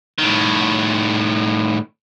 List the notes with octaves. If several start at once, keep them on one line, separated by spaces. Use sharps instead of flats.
A2 D#3